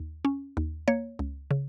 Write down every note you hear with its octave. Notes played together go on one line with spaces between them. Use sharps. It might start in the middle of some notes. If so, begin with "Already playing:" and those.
Already playing: D#2
C#4
D#2
A#3 C#5
C#2
C#3